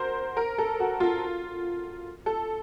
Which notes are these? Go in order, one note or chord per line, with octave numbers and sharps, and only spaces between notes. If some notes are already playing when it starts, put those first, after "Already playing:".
Already playing: F#4 A#4 C5
A#4
A4
F#4
F4
A4